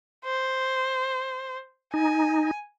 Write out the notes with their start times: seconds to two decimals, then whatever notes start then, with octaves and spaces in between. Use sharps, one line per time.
0.25 C5
1.94 D#4 G#5